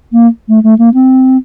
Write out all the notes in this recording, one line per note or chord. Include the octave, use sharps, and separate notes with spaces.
A#3
A3
A3
A#3
C4